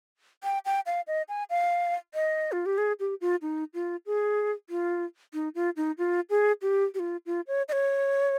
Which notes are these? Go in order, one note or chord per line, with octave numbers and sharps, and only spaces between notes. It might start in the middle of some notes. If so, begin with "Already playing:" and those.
G5
G5
F5
D#5
G#5
F5
D#5
F4
G4
G#4
G4
F4
D#4
F4
G#4
F4
D#4
F4
D#4
F4
G#4
G4
G4
F4
F4
C#5
D#5
C#5